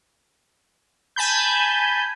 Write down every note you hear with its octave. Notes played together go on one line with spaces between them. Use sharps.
G#5 A5 B5 G6